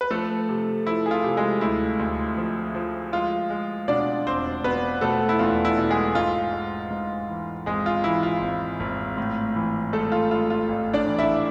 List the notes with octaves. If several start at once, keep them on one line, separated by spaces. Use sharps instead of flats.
B4
F3 A3 A4
C3
F3 E4
G#4
F4
C3
G#3 G#4
D2 E4
D2
F3
F3
G#3 F4
G#3
B2 D4 D5
E1 C4 C5
B2 B3 B4
B2 A3 A4
E4
E2 F4
E4
B2
G#3 G#4
G#2 F4
G#3
G#2
E3
G#1 G#3 G#4
F4
E3 E4
F4
G#1
G#1
A2
E3
G#3 A3 A4
F4
G#3 F4
F4
A1
D4 D5
E3
E4 E5